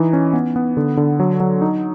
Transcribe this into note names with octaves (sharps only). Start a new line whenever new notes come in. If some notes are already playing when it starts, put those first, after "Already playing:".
Already playing: E3 D#4
C#4
B3
B3
D3
D3
F#3
F#3
D#4